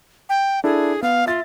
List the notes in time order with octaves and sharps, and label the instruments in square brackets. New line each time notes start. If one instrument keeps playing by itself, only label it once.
[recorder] G5
[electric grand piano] D4 E4 A4 [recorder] G#4
[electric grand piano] B3 [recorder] F5
[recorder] F4 [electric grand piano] E5 A6